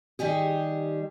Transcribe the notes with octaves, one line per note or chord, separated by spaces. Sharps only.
D#3 G3 G4 G#4